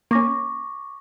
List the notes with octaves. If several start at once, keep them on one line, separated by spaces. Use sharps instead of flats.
A#3 C#4 C#6 D6 A#6